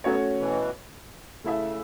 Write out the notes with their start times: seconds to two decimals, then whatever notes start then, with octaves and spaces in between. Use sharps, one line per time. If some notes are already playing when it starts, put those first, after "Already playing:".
0.04 F#3 A3 B3 C#4 F#4 C#5
0.39 B2 E3
1.43 C#3 A3 E4 A4 E5